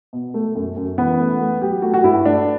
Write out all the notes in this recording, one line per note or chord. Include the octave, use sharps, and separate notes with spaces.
B2
A3
F#2
F#2
E3 B3
A3
A3
F#3 G4
A3 F#4
F#4
G2 E4
A3 D4